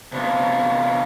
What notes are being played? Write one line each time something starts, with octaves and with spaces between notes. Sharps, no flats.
C3 B3 D4 F4